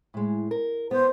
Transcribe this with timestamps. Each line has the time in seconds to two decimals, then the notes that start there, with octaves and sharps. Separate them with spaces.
0.14 A2 G#3
0.51 A#4
0.91 B3 C5